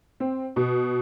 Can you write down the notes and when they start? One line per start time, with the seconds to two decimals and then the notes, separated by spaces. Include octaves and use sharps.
0.20 C4
0.56 B2